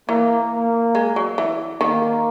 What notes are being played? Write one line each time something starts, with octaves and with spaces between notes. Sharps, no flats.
E3 A#3
A#3
G#3
F#3
E3
D#3 A#3